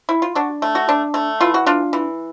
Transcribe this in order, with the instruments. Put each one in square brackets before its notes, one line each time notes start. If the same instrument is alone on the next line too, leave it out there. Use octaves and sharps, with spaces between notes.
[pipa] E4
F4
D4 F#4
A3
F#4
D4
A3
E3 F4
F#4
D4 F4
E3